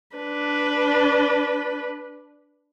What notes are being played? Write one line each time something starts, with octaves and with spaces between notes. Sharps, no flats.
D4 B4